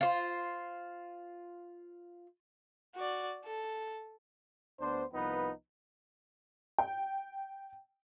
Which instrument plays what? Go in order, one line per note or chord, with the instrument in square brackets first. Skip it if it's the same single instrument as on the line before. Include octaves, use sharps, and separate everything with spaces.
[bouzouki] F4 C5
[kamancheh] F#4 D5
A4
[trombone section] D2 B3 D4 C5
C2 F3 B3 D#4 B4
[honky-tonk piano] G5